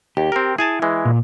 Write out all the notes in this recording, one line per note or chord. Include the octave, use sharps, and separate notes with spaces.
D#2 G4
C4 A#4
E4 G#4 G#5 A5
E3 G#3
A#2